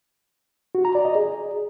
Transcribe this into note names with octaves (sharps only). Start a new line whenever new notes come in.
F#4
A#5
D5
D#5
G#4